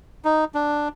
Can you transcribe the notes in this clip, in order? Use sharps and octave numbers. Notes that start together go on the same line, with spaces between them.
D#4
D4